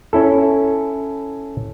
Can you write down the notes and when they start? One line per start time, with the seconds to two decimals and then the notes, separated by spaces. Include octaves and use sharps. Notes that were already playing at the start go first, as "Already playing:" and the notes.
0.13 C#4 E4 A4